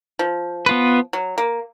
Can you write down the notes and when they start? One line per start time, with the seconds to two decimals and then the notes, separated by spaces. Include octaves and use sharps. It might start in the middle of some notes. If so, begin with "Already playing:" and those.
0.19 F3
0.66 B3 F4 B4
1.13 F#3
1.38 A#3